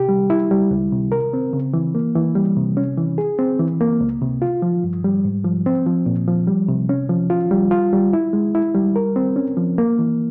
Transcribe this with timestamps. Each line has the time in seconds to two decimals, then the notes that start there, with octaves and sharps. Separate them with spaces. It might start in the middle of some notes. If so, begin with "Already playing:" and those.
Already playing: C3 G4
0.09 G3
0.30 E4
0.51 G3
0.71 C#2
0.92 C3
1.12 A#4
1.33 C4
1.53 C#3
1.73 E3
1.95 A#3
2.15 E3
2.36 G3
2.56 C3
2.77 C#4
2.97 E3
3.18 G#4
3.39 C4
3.59 E3
3.81 A#3
4.01 C#2
4.22 C3
4.42 F4
4.62 F3
4.84 G2
5.04 G3
5.25 G#2
5.44 F3
5.66 C4
5.86 F3
6.06 A#2
6.28 F3
6.47 G3
6.68 C3
6.89 C#4
7.09 F3
7.30 F4
7.51 G3
7.71 F4
7.93 G3
8.13 E4
8.33 G#3
8.55 E4
8.75 G3
8.96 A#4
9.16 C4
9.36 C#4
9.57 F3
9.78 A#3
9.99 E3